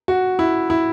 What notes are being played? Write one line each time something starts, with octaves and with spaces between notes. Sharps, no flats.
F#4
E4
E4